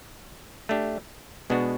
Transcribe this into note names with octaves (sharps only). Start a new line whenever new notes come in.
A3 D4 G4
B2 G#3 B3 D4 F#4